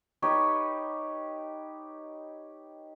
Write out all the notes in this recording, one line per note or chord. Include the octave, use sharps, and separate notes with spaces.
D#4 G4 B4 C#5